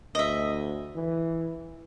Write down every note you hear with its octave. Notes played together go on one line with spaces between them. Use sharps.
D2 D#5 E5
E3